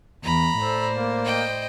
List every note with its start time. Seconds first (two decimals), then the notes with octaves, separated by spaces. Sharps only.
0.23 E2 A#5 B5
0.58 A2 A4 C5 D5
0.93 A#3
1.25 D#5 G5